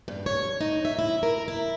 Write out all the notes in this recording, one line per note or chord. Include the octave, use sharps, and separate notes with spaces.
G2
C#5
D#4
E5
E4
A#4
E4